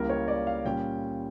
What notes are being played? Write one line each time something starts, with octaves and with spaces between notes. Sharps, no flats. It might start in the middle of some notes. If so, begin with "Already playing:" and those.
Already playing: C#2 C#3 G3 A#3 E4 A#4
C#5
D5
F5
A#2 G3 C#4 G5